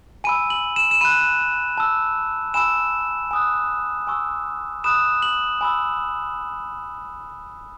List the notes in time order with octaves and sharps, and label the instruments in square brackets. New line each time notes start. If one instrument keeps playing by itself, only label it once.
[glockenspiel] G#5 B5 E6 D#7
F#7
E7
E7
B5 F#6 D#7
A5 E6
G#5 B5 E6 E7
G#5 D#6 F#6
G#5 C#6 E6
B5 D#6 F#6 E7
F#7
G#5 B5 E6